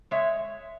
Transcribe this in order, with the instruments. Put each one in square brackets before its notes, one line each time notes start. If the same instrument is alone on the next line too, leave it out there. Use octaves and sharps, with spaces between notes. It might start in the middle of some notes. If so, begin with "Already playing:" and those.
[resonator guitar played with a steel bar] G#3 C#5 E5